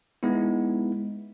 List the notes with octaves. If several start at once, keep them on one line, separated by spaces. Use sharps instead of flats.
G#3 B3 D#4 E4